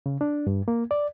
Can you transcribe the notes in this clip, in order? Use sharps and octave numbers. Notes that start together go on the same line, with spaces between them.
C#3
D4
G2
A#3
D5